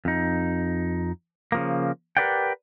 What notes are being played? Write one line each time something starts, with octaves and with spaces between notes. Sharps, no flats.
F2 D#4
C#3 F3 A#3
G4 A#4 B4 D5 F#5 G5